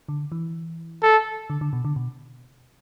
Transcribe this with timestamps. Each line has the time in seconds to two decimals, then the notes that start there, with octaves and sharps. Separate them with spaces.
0.09 D3
0.32 E3
1.03 A4
1.50 D3
1.61 D3
1.73 B2
1.85 D3
1.96 B2